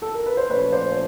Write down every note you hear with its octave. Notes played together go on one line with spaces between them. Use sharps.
A4
A#4
B4
C5
A#2 F3 A3 C#4 B4 C#5
C5 D5
C5